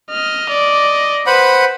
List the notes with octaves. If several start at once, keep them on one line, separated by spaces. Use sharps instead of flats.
D#5 F6
D5
B4 C5 F#5 B5